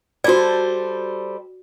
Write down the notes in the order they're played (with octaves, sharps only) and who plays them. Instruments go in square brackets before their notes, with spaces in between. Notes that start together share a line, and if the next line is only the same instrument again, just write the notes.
[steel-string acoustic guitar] G3 A4 C5 [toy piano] F#4 D5